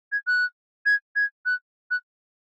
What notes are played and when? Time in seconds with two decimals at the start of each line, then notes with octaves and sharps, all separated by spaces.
0.12 G#6
0.27 F#6
0.86 G#6
1.16 G#6
1.45 F#6
1.91 F#6